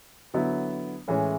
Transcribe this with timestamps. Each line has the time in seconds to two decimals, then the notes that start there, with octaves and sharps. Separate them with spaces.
0.34 D3 F#3 B3 E4
1.08 A2 E3 G#3 C#4